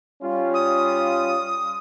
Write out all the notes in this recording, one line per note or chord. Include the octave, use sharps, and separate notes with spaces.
G3 C#4 F4
D#6